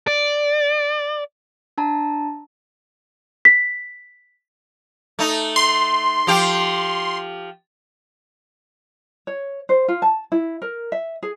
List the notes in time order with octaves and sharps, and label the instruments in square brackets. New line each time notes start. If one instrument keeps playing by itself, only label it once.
[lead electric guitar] D5
[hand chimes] D4 A5 A#5
[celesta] B6
[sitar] A3 D#4
[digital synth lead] C6
[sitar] F3 G4
[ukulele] C#5
C5
F4
A5
E4
A#4
E5
G#4